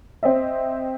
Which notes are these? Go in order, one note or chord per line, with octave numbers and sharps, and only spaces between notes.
C4 C5 D#5 E5